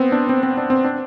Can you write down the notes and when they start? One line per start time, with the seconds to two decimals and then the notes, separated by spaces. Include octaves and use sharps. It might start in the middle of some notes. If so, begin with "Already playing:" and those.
Already playing: B3 C4
0.12 D4
0.29 C4
0.43 C4
0.57 D4
0.70 C4
0.84 D4